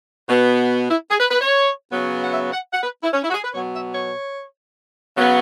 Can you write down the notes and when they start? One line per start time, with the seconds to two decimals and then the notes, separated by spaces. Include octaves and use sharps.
0.29 B2 B3
0.90 E4
1.10 G#4
1.20 B4
1.31 B4
1.41 C#5
1.91 C#3 F#3 B3
2.24 F#5
2.32 E5
2.52 F#5
2.72 F#5
2.83 B4
3.03 E4
3.13 C#4
3.24 E4
3.30 F#4
3.34 G#4
3.44 B4
3.54 B2 F#3 B3 C#5
3.75 E5
3.94 C#5
5.16 C#3 F#3 B3